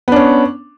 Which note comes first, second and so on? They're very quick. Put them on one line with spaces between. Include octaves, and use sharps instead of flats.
B3 D4 C#4